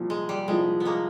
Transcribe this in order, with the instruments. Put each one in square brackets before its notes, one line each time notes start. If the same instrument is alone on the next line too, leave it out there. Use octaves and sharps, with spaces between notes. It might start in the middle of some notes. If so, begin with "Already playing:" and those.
Already playing: [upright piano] C2 A#2 F3
[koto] G#3
G3
[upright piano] C2 A#2 F3 [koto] G#3
[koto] B3
G#3 A#3